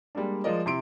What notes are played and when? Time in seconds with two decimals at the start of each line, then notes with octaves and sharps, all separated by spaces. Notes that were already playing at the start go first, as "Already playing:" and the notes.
0.15 G3 G#3 A#3 D4
0.44 F3 G#3 F4 A#4 D5 D#5
0.66 C3 E4 C6 D7